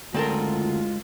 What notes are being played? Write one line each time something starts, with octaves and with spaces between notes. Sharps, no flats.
F#1 D2 G#3 C4 F4 A4 A#4 A#5